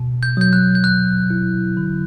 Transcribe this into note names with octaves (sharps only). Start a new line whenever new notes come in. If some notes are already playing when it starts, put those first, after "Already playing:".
Already playing: B2
G6
F#3 G6
F#6
G6
F#3 F#6
E4
D3